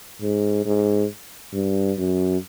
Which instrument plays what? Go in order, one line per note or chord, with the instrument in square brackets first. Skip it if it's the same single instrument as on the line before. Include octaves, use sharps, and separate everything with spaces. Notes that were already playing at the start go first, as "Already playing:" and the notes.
[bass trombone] G#2
G#2
G2
F#2